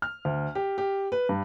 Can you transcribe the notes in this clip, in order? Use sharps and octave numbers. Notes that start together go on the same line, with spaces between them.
F6
D2
G4
G4
B4
G2